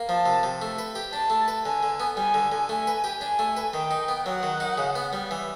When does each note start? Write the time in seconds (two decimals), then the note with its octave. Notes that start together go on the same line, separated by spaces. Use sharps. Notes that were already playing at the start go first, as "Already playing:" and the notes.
Already playing: A#3
0.09 F3 A5
0.26 C3
0.43 C3
0.62 A3
0.78 B4
0.95 G4
1.13 D4 A5
1.30 A3
1.48 B4
1.65 D3 G#5
1.83 D3
2.00 B3
2.17 G3 G#5
2.34 D3
2.52 D3
2.69 A3 G#5
2.87 B4
3.04 G4
3.21 D4 G#5
3.39 A3
3.57 B4
3.74 D#3 G5
3.91 D#4
4.08 B3
4.26 F#3 F#5
4.43 D#3
4.60 D#4
4.78 C#3
4.96 B3
5.13 G3
5.31 E3